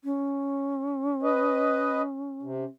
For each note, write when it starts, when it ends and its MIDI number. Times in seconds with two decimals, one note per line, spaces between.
0.04 2.67 61
1.23 2.02 71
1.23 2.02 75
2.43 2.64 48